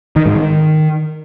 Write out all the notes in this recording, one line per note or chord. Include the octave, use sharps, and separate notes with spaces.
D#3
G#2
D#3